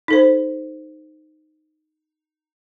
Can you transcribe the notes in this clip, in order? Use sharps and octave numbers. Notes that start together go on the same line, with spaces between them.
D#4 A4 C5